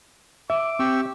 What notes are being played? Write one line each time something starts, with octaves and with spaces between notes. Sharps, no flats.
E5 D6
C4 G4 C#6 E6